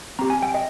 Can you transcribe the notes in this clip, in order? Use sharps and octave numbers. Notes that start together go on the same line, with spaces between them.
C4 G4 A#5
G#5
G5
D#5